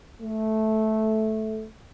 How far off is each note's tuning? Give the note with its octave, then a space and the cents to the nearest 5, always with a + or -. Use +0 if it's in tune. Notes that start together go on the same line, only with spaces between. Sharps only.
A3 -10